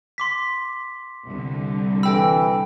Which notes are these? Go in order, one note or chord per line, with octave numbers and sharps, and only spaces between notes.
C6 D6 B6
C2 D3
E3 A4 G5 B5 E6